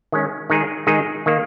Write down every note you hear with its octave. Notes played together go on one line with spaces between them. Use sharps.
D#3 G#3 C#4
D#3 G#3 D#4 G#4
D#3 G#3 D#4 G#4
D#3 A#3